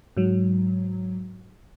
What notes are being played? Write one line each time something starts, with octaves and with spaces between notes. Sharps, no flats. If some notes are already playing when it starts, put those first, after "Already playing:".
G#2 F#3